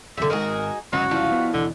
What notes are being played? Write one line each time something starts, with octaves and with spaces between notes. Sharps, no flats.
D#1 B1 D3 G3 E5
G#1 G#2 D#4 F#4 G#4 A#4
G1 C#2 F#3 B3 C#4 D#4 F#4
F3 E4 D5 D#5 F5
B3
D#2 B2 D3 E3